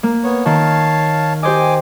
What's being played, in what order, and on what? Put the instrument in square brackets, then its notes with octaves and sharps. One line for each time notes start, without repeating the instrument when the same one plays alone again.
[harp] A#3
[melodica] B3 C#5
[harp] D#3 [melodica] C#5 F5 A5
[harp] G4 C5 D#5 [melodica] G#5 D6